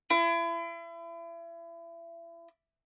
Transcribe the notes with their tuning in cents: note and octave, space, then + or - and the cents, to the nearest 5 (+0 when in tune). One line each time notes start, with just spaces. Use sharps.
E4 +35